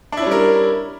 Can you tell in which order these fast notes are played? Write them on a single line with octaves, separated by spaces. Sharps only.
D4 E4 C#4 G3 A#4